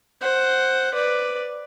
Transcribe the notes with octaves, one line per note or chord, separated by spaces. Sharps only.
C5 F#5
B4 D5